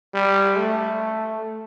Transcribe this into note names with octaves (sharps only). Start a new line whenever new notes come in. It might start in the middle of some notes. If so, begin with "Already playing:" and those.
G3
A3